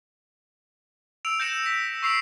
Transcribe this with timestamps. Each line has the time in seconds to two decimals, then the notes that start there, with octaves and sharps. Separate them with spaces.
1.25 E6 D7 F7 F#7
1.40 G6 A#6 C#7 E7
1.66 B6
2.03 C#6 E6 C7 D7 F7